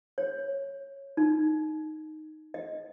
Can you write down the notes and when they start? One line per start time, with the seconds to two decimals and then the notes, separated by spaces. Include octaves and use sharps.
0.18 C#5
1.17 D#4
2.54 D#5